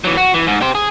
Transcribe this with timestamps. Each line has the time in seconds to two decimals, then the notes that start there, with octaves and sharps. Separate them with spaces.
0.04 E3 F#3
0.17 F#4
0.34 E3
0.47 G#2
0.61 G4 C5
0.75 G#4